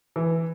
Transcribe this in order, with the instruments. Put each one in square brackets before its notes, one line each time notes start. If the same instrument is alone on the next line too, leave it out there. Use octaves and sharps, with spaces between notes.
[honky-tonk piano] E3